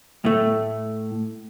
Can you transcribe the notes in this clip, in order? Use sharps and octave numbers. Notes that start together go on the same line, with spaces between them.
A2 A3